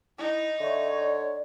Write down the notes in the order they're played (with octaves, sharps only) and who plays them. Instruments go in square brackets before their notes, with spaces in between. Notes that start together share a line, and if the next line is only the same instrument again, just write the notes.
[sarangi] D#4 [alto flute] E4
[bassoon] D3 [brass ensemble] C#5 [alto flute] E5
[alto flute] D5